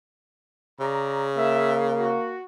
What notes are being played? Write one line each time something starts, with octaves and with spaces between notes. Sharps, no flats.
C#3 D5 A#5
A#3 E5
F#4